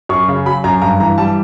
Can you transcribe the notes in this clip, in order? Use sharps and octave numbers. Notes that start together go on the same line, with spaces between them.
F#2 C#6
C#3
F#3 B5
F#2 A#5
G2 A#5
E3 A#5
G3 A5